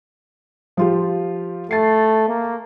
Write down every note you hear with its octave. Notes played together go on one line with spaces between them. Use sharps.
F3 F4 G4
A3 A6 C7
A#3